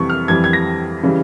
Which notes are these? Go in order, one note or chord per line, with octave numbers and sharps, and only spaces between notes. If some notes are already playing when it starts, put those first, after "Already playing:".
Already playing: F2 C3 E3 G3 C#6
F6
F2 E3 G3 G#6
G#6
A#6
C#3 E3 G3